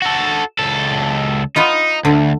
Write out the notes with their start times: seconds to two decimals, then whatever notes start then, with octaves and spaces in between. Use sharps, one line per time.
0.02 F#4 A4
0.59 C#2 A4
1.56 B3 D#4 F4 D#5
2.05 D2 D3